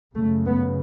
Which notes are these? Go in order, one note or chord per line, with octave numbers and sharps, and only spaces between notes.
F#2 C#3 A3
B3